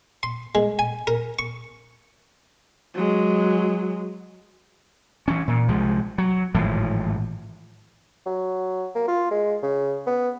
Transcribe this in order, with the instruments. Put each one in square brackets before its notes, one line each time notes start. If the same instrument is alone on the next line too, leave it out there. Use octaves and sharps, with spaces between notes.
[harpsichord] C6
G#3
G#5
A#4
C#6
[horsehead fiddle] F#3 G#3
[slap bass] E3 C#4
A#2
C2 F3 G#3
F#3
G#1 A2 E3 F3
[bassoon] F#3
A#3
F4
G#3
C#3
B3